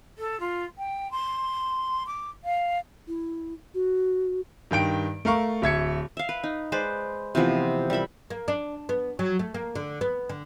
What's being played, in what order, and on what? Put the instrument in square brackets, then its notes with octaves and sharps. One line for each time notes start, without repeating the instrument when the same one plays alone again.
[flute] A4
F4
G5
C6
D6
F5
[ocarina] E4
F#4
[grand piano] G2 D#3 G5 D7
A3 A#4 F5 C#6
D1 E5 G#6 C#7
[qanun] E5 F5
B4
D#4
G#3 B4 C5 D5
C3 E3 F3 B3
G3 A#4 E5 B5
[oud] A#3
D4
B3
F#3
A3
A#3
D3
B3
D3